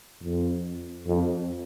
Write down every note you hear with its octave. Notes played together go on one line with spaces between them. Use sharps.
F2
F2